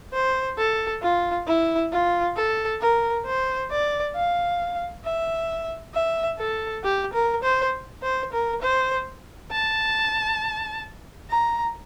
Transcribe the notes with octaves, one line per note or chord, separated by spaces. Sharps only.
C5
A4
F4
E4
F4
A4
A#4
C5
D5
F5
E5
E5
A4
G4
A#4
C5
C5
A#4
C5
A5
A#5